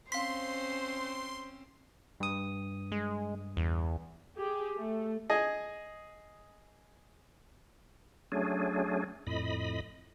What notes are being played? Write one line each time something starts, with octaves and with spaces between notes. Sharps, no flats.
C4 C#4 C5 F5 C6 B6
G2 D#6
G#3
E2
G4 G#4
A3
G#4 D#5 G#5
F#3 A3 C#4 D4 G#4
F2 A2 D#5 B5